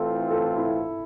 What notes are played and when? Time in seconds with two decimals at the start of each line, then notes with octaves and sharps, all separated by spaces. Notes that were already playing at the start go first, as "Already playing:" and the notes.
Already playing: A2 E3 A3 C4 F4 A4
0.30 A4
0.57 E4